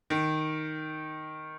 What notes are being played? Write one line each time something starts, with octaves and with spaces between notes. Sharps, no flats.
D#3